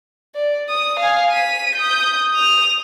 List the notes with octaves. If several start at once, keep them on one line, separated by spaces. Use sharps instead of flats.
D5
D#6
F5 G#5
B6 D#7
D#6 G6
D#6 F7